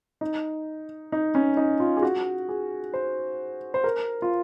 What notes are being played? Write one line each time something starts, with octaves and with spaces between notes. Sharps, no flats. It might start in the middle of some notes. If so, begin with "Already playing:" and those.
D#4
D#4
C#4
D#4
F4
G#4
F#4
G#4
C5
C5
A#4
F4